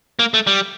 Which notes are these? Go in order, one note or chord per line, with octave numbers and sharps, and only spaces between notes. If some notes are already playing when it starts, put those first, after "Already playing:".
A#3
A3
G3